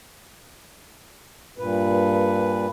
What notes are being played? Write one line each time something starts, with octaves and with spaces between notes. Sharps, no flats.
G2 A#2 B4